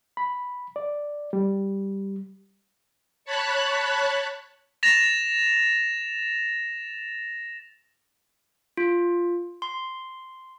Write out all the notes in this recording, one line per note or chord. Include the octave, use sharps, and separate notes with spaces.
B5
D5
G3
C#5 A5 B5 F#6
A6 A#6 E7 F7
F4
C6